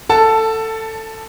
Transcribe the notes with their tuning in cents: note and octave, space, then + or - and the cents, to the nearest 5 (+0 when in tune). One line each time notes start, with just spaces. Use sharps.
A4 +15 F#5 +0 A5 +0